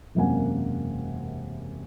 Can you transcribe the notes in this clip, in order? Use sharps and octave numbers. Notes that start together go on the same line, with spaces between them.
E1 F#2 C3 A#3 F#5 G#5